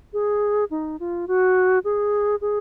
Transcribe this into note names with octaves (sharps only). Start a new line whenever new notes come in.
G#4
D#4
F4
F#4
G#4
G#4